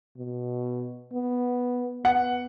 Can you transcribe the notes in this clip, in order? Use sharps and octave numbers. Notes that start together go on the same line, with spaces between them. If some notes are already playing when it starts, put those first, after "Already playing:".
B2
B3
B3 F#5